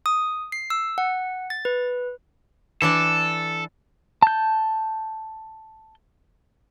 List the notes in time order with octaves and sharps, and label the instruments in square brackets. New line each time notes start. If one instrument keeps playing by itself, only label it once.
[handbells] D#6
C7
E6
F#5
A6
B4
[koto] E3 D4 D5 [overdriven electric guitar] A4
[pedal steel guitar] A5 G6